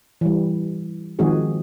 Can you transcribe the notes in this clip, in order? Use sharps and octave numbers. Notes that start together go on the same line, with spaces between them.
E3 G3
D#3 F3 G#3 C4 F#4 G#4